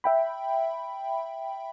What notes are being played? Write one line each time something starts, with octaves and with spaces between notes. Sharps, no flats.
E5 G5 B5